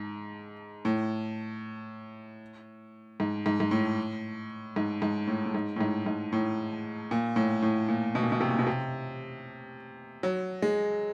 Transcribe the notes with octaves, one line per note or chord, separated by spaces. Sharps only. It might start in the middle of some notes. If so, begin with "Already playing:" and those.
Already playing: G#2
A2
G#2
G#2
G#2
A2
G#2
G#2
A2
A2
G#2
A2
G#2
G#2
A2
A#2
A2
A2
A#2
B2
A#2
B2
C3
A#2
B2
C3
F#3
G#3